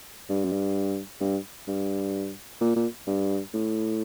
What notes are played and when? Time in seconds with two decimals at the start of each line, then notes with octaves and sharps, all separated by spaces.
0.29 G2
0.44 F#2
0.52 G2
1.21 G2
1.68 G2
2.61 A#2
2.76 A#2
3.07 G2
3.54 A2